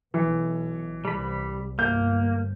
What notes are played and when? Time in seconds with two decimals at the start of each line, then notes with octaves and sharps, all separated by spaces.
0.14 B1 E3
1.05 C2 G3 B5
1.79 G1 A#3 G6